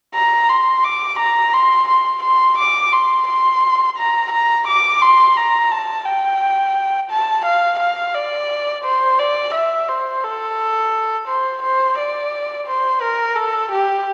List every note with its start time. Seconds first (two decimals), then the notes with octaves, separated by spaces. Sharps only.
0.15 A#5
0.49 C6
0.84 D6
1.19 A#5
1.53 C6
1.88 C6
2.23 C6
2.58 D6
2.93 C6
3.28 C6
3.97 A#5
4.32 A#5
4.67 D6
5.02 C6
5.37 A#5
5.71 A5
6.06 G5
7.10 A5
7.45 F5
7.80 F5
8.14 D5
8.84 C5
9.19 D5
9.54 E5
9.88 C5
10.23 A4
11.28 C5
11.63 C5
11.98 D5
12.67 C5
13.02 A#4
13.36 A4
13.71 G4